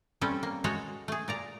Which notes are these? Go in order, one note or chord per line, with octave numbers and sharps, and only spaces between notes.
G3 A3 C4 C#4 A4
A#3
G#3 A3 F#4 A4 C#5 F#5
A3 G#4
A#2 D5 A#5